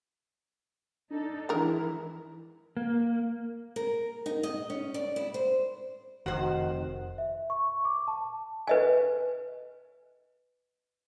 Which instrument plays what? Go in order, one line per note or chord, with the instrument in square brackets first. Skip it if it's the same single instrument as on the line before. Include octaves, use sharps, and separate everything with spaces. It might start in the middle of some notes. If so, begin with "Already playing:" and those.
[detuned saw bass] D4 [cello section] D#4 A4
[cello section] E3 E4 [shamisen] G#3 A#4
[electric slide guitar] A#3
[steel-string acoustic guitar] A#4
D#4
D#5
C#4
D5
E4
C5
[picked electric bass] F1 [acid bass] D#3 [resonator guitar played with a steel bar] F#4 C5
[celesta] E5
C#6
D6
A5
[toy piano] B4 D#5 G#5